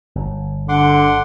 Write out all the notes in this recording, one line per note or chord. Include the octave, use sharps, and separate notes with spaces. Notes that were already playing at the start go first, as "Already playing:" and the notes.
G1
D3 F#5 C6 D6